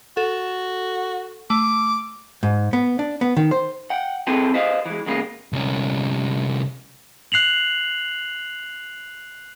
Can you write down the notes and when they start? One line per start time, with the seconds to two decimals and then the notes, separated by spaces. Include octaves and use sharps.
0.17 F#4 A4
1.50 A3 D6
2.43 G#2
2.73 B3
2.99 D4
3.21 B3
3.37 D#3
3.51 C5
3.90 F#5 G5
4.27 C4 E4 G#4 A4 B4 G5
4.54 B4 C5 D#5 F5
4.86 E3 G#3
5.06 E2 C#3 G#3 A#3 B3
5.53 C2 C#4
7.32 F#6 C7 F7 F#7